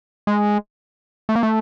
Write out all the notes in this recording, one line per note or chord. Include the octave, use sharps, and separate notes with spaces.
G#3
A3
A#3
A3